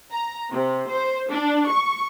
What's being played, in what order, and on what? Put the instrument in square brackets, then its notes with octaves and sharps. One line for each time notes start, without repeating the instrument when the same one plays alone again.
[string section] A#5
C3
C5
D4
C#6